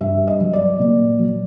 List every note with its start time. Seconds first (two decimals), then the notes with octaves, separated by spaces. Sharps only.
0.01 G2 E5
0.27 D#5
0.41 F#3
0.53 D5
0.79 A#2
1.19 F#3